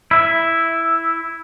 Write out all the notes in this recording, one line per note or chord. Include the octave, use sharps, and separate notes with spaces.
E4 E5